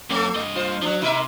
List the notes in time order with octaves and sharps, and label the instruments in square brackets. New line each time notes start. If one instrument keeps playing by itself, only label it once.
[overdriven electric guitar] F#2 C#4 [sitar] A3 A4
[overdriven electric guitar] G2 D#5
[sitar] F4 C5
[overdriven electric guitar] F3 F#3 [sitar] D4
[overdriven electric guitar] C3 [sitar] D#4 A#4 E5